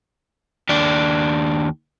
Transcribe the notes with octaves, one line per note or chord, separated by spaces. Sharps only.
D#2 D4